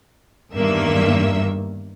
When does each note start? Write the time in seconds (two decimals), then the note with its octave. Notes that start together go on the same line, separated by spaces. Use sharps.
0.53 E2 G2 D#3 A#3 E5